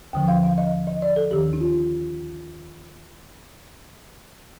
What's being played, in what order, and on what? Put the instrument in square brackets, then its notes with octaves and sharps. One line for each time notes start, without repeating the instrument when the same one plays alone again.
[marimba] D#2 D3 F3 G5
F5
F5
D#5
D#5
D5
A4
D#2 D#3 G4
D#4
F4